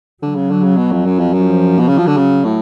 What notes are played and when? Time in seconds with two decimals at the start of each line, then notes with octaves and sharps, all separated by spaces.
0.22 D3 F#3
0.36 C#3
0.51 D3
0.64 C#3
0.77 B2
0.92 F2
1.06 F#2
1.19 F2
1.33 F#2 F3
1.79 B2
1.88 C#3 F#3
1.98 F3
2.07 D3
2.17 C#3
2.45 A2